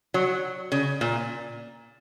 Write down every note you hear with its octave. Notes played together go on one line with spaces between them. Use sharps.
F#3
C#3
A#2